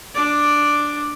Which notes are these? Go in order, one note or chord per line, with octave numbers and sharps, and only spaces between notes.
D4 D5